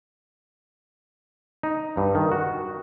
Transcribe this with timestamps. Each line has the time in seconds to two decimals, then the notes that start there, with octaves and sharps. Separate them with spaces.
1.63 D#4
1.97 G2
2.15 D#3
2.32 F#4